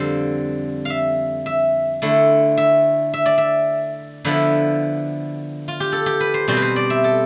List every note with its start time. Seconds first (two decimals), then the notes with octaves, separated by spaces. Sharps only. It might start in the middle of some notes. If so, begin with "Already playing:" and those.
Already playing: F2 D3 G3 C4 F5
0.85 E5 F5
1.46 E5
2.02 D3 A3 E4
2.58 E5
3.14 E5
3.26 D5
3.38 E5
4.25 D3 F3 B3 E4 B4
5.68 F4
5.80 G4
5.92 A4
6.06 G4
6.20 B4
6.34 C5
6.48 B2 G3 C4 C5
6.57 B4
6.62 C5
6.76 D5
6.90 E5
7.04 A4